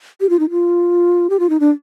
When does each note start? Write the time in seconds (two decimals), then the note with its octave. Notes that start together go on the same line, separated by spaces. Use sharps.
0.21 G4
0.29 F4
0.39 D#4
0.50 F4
1.30 G4
1.40 F4
1.50 D#4
1.60 D4